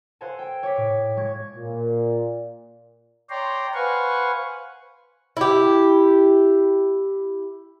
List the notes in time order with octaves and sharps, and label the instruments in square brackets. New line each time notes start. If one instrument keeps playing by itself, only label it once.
[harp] A4 C5 F5 F#5 G#5 A5
G5 D7
C#5 D6 B6
A2
G#3 C#6 G#6
[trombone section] A#2
[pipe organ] C#5 D5 G5 A#5 C6
B4 C5 F5 F#5 G#5 C#6
[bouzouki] E4 G4